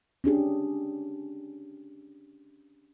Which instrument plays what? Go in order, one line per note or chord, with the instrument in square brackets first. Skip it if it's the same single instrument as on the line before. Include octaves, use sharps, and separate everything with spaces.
[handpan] C#4 D4 G4 G#4